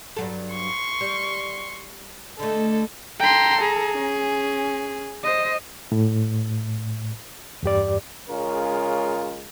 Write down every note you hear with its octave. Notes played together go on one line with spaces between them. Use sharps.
G2 F#3 A4
C6 C#6
G3
D3 A3 A4 D#5
A4 G5 A#5 C6
G#4
C#4
C5 D#5
A2
E2 G2 G4 D5
C#3 G#3 C#4 F4 A#4